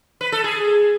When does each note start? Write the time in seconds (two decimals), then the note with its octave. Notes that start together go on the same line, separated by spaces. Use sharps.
0.21 B4
0.32 A4
0.44 G#4